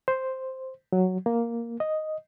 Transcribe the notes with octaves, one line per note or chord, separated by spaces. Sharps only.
C5
F#3
A#3
D#5